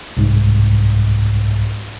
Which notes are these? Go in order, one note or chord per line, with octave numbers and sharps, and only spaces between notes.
C2 G#2